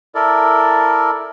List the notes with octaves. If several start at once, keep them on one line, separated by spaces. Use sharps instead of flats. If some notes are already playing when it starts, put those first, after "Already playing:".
E4 A4 A#4 D5